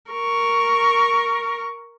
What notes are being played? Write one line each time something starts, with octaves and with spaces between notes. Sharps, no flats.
A#4 C#6